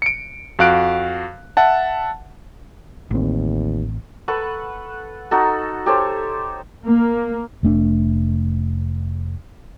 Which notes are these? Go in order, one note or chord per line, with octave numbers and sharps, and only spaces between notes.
C#7 D7
F2 F#4 F5 F#6 D7
E5 F#5 A5
A1 D#2 C4
A4 B4 F#5 C#6
D#4 F#4 A4
G4 A4 C5 C#5
A#3
F1 A3 D4